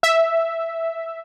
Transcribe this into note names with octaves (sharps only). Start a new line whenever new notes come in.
E5